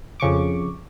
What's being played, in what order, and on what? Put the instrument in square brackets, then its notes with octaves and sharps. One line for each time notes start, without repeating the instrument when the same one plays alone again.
[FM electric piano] F2 C#3 C#6 D6